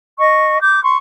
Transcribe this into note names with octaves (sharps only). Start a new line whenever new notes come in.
D#5 C#6
D6 G6
C6 C#6